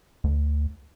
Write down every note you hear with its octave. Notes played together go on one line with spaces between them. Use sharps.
D2